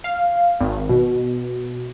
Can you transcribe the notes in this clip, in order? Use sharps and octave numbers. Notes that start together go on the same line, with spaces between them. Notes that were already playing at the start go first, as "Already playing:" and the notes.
F5
G#1
B2